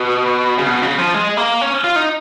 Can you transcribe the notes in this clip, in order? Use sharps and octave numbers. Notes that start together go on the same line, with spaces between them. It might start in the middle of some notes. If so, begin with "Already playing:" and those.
Already playing: B2
C#3
B2
C#3
F3
G#3
A#3
C#4
F4
D#4